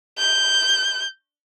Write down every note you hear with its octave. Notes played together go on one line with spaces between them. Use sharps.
G6